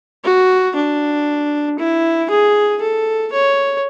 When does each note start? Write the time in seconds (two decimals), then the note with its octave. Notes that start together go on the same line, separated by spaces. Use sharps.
0.24 F#4
0.76 D4
1.79 E4
2.30 G#4
2.81 A4
3.32 C#5